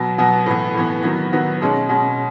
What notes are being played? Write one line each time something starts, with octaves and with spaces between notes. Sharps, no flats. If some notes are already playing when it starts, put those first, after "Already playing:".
Already playing: B2 F#3 B3
B2 F#3 B3
A2 E3 B3
A2 E3 B3
D#3 F#3 B3
D#3 F#3 B3
B2 G#3 C#4
B2 G#3 C#4